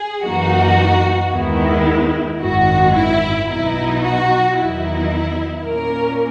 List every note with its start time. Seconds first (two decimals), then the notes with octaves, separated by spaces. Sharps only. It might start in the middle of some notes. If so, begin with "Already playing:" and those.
Already playing: G#4
0.24 F#2 E3 A#3 D#4 F#4
1.32 D#2 D#3 G#3 B3 E4
2.40 G#1 F#2 D#3 F#4
2.95 E4
3.48 B1 B2 F#3 B3 D#4 E4
4.03 F#4
4.57 E2 D#3 F#3 B3 D#4 E4
5.65 A#2 A#3 C#4 A#4